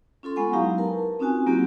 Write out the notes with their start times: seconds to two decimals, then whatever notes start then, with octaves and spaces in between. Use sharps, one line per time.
0.23 C#4 F4 A4 C6
0.36 G#3 B3 F#5 G#5 C#6
0.53 F#3 D#4 E4 G4 F5 A#5
0.78 A#4 B4 A5
1.19 C4 C#4 D#4 F4 F#4 G#5
1.46 F#3 A#3 C4 E4 F#4 G4